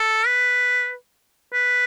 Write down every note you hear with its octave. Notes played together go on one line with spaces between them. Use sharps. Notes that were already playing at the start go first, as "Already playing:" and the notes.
Already playing: A4
B4
B4